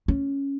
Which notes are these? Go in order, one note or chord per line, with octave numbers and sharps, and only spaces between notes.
C#4